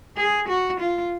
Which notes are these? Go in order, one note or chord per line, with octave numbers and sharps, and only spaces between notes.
G#4
F#4
F4